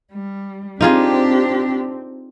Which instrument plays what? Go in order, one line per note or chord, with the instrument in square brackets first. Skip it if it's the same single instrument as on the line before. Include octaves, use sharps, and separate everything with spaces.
[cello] G3
[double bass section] C4 [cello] D4 G4 [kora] D#4 F4 G#4